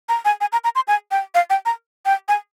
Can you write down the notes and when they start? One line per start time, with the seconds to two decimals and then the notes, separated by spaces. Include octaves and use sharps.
0.09 A#5
0.25 G#5
0.41 G#5
0.52 A#5
0.64 A#5
0.76 C6
0.88 G#5
1.11 G5
1.35 F5
1.50 G5
1.66 A#5
2.06 G5
2.28 G#5